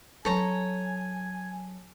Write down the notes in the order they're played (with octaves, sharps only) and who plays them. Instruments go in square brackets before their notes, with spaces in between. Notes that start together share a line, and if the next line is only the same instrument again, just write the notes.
[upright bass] F#3 C#4 [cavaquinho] A4 C#5 A#5 [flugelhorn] G#5